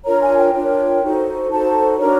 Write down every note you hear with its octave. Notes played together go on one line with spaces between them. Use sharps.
D4 F4 A#4 C#5 A#5
G#5
G5
D4 F4 A#4 C#5
D#4 F#4 A4 C5
D#4 F#4 A4 C5 A5
D4 F#4 A#4 C#5 A#5